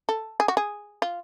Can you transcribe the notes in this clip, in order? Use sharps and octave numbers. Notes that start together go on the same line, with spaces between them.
A4
G#4
F#4
G#4
F4